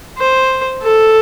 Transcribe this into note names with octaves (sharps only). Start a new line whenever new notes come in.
C5
A4